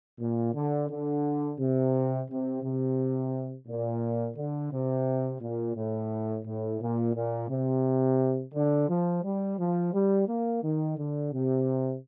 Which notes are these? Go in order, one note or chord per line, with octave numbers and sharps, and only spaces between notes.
A#2
D3
D3
C3
C3
C3
A#2
D3
C3
A#2
A2
A2
A#2
A#2
C3
D3
F3
G3
F3
G3
A#3
D#3
D3
C3